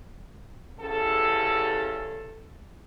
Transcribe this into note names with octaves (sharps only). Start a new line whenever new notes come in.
E2 C#3 G4 A4